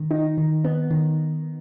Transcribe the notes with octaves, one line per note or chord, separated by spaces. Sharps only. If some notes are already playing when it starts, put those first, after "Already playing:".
Already playing: D#3
D#4
D#3
B3
D#3